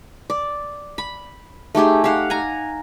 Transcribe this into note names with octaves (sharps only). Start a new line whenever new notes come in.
D5
B5
A3 D#4 G4 G#4
G4 F5 F#5
G#5 A#5